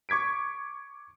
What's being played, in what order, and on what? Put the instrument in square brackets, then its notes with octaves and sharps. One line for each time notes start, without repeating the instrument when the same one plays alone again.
[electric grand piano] C#6 D6 G#6 B6 D7